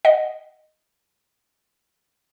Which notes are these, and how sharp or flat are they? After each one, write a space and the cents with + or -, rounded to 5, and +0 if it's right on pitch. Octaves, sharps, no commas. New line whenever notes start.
D#5 +0 F#5 +0